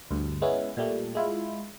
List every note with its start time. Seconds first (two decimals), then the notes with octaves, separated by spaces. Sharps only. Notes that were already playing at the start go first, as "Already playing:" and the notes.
0.11 D2 G2
0.42 G#3 B3 C#4 E4
0.77 A#2 G3 A3
1.15 G#3 E4 F4